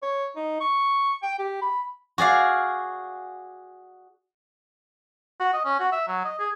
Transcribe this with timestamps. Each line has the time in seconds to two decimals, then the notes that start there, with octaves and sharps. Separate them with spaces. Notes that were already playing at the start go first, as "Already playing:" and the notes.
0.02 C#5
0.36 D#4
0.61 C#6
1.23 G5
1.39 G4
1.62 B5
2.18 F#4 G#4 D5 F5
5.40 F#4
5.53 D#5
5.65 C#4
5.79 F#4
5.92 E5
6.07 F#3
6.24 D#5
6.39 G#4